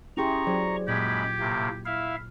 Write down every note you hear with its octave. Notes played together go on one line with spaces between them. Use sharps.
C#4 E4 G4 G#4 G5 A#5 C6 C#6
F#3 G#4 C5 D5
F#2 A#2 G#3 G4 B5 G#6
A2 C3 A#3
E4 E5 F5 F6